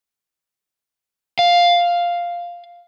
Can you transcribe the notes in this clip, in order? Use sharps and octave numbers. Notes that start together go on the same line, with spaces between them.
F5